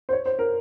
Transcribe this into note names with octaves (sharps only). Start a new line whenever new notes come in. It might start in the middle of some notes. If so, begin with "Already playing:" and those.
C5
C#5
C5
A#4